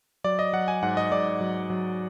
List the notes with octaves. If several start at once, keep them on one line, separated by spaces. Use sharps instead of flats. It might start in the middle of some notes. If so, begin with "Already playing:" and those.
F#3 D5
D#5
F#3 F#5
G#5
G#2 F#5
D#5
G#2 D5
F#3
F#3